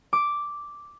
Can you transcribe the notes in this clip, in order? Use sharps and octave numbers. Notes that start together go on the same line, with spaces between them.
D6